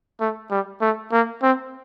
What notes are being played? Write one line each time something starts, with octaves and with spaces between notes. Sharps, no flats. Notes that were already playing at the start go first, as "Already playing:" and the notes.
A3
G3
A3
A#3
C4